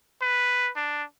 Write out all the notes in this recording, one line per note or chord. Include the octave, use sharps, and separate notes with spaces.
B4
D4